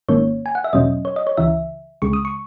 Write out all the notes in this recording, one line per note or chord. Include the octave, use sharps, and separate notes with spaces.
G#1 G#2 D#3 A#3 C#4 C#5
G#5
F#5
E5
E2 B2 F#3 C#4 D#5
C#5
D#5
C#5
C#2 C#3 E3 E5
C#2 C#3 G#3 C#6
D#6
C#6